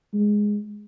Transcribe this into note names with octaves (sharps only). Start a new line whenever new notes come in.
G#3